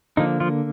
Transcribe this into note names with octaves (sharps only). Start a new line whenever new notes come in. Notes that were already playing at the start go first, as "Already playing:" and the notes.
D3 F3 A#3 D#4
F3 F4